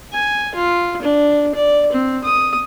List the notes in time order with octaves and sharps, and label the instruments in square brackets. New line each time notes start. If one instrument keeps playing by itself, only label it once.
[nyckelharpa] G#5
F4
D4
D5
C4
D#6